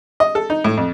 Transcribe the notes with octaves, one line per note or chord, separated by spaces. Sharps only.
D#5
A4
D#4
A2
F2